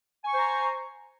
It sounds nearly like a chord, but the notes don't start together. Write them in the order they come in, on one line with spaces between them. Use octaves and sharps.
G#5 C#6 C5 A#5